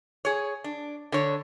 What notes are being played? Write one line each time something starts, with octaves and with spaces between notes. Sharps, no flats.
G#4 C#5
D4
D3 C#5